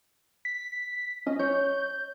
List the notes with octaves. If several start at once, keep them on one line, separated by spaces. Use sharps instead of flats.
B6
C#4 D#5
C#5 G6